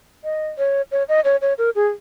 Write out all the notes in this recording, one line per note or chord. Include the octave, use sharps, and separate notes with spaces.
D#5
C#5
C#5
D#5
C#5
C#5
A#4
G#4